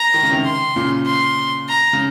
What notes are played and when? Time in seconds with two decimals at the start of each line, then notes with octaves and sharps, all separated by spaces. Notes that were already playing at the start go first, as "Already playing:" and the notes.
Already playing: A#5
0.14 D#3
0.23 C#3
0.31 C3 D#3
0.45 C6
0.76 A#2 C#3
1.06 C6
1.68 A#5
1.93 C#3